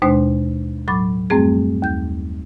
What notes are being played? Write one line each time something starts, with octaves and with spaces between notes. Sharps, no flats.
D#2 B2 G#3 D4 C5 C6
A2 F#3 B5 D6 A6
F#2 G3 A3 C4 G#4
D#2 G6